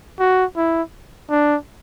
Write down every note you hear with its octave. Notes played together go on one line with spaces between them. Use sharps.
F#4
E4
D4